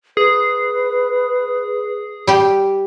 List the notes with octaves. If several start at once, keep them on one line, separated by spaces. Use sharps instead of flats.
G#4 B4
G3 G4